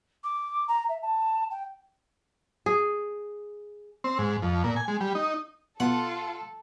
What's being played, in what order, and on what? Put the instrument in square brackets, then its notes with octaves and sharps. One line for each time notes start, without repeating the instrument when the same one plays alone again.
[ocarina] D6
A#5
E5
A5
G5
[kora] G#4
[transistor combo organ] C4
G#2
F2
A#2
G#5
G#3
G3
D#4
[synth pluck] B2 B3 [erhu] F4 [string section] A4 [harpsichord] F#5